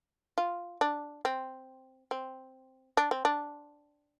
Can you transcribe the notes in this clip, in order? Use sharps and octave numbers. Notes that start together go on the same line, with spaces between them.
F4
D4
C4
C4
D4
C4
D4